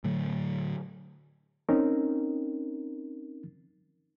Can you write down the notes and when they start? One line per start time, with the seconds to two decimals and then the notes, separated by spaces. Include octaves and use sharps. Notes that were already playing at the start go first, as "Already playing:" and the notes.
0.04 A2 D3 F#3 A3
1.69 C4 C#4 D#4 A#4